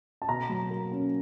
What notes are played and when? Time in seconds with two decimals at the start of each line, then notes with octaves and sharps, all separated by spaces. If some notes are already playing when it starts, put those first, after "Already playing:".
0.22 A5
0.29 B2 A#5
0.49 F#3
0.70 A#3
0.92 C#4